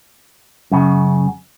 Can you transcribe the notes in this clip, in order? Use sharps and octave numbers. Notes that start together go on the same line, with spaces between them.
F#2 C#3